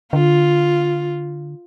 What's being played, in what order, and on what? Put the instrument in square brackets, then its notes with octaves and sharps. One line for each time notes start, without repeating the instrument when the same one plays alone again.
[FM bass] D3 [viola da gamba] F4